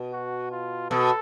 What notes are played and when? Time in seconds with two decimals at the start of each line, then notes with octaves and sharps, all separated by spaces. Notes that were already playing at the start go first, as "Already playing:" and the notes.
Already playing: B2
0.12 F#4
0.51 F4
0.90 B2 A4